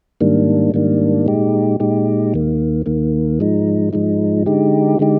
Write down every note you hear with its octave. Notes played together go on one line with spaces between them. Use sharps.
G#2 D#3 G3 A#3 D4
G#2 D#3 G3 A#3 D4
A#2 G#3 D#4 G4
A#2 G#3 D#4 G4
D#2 D#3 A#3
D#2 D#3 A#3
G#2 F3 G#3 D#4
G#2 F3 G#3 D#4
D3 G#3 D#4 G4
D3 G#3 D#4 G4